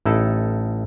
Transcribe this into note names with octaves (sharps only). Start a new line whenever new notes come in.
A1 D#4 E4 A4 A5